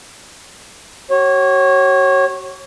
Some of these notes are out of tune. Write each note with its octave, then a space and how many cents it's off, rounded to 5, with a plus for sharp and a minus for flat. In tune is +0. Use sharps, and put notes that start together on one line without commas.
F#4 +40 C#5 -25